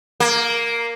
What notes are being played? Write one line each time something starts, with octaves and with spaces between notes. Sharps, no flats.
A#3